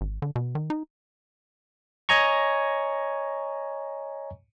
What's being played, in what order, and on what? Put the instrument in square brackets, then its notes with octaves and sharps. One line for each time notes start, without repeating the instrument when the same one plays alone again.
[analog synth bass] G#1
D3
B2
D#3
D#4
[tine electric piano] C#5 D#5 G#5 A#5 C#6